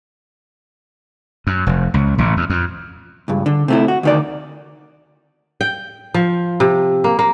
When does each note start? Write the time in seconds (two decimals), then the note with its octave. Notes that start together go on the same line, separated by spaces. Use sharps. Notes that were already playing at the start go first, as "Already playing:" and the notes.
1.47 F#2
1.67 F1
1.94 C#2
2.18 A1
2.37 E2
2.50 F2
3.28 C#2 G2
3.46 D3
3.68 C3 A3 E4
3.88 F#4
4.03 D2 D#3 D5
5.61 G5
6.14 F3
6.60 C3
7.04 A#3
7.19 A#3